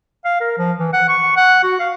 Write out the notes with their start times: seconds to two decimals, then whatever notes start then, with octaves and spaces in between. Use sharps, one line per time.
0.25 F5
0.41 A#4
0.58 F3
0.79 E3
0.93 F#5
1.09 C#6
1.37 F#5
1.63 F#4
1.80 F5